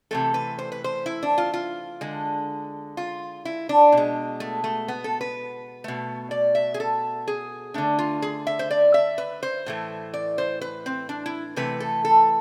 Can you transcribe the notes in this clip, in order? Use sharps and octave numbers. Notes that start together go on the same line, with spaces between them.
C3 E3 A3 A4
B4
C5
B4
C5
E4
D4
F4
F4
D3 G#3
F4
E4
D4
B2
G#3
A3
A3
B3
A4
B4
B2 A3
D5
E5
G#4
A4
G#4
D3 A3 D4
F4
G#4
E5
C5
D5
E5
B4
C5
A2 E3 A3
D5
C5
B4
C4
D4
E4
C3 E3 A3 B4
A4
A4